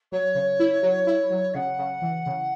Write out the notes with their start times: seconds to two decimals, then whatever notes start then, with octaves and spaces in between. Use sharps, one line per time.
0.12 F#3 C#5
0.35 C#3
0.60 E4
0.83 F#3
1.07 E4
1.30 F#3
1.54 C#3 F#5
1.78 C#3
2.02 E3
2.26 C#3